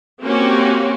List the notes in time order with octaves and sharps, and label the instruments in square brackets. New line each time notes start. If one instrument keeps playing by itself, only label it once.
[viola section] A#3 C4 C#4 F#4 G4